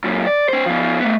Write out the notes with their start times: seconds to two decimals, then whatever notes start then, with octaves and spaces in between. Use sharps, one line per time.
0.04 F#2 A#2
0.27 D5
0.49 C#4 C5
0.66 F3 B3
1.00 A3 B3